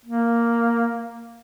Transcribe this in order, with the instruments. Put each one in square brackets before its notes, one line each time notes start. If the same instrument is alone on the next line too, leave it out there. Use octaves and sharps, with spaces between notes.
[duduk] A#3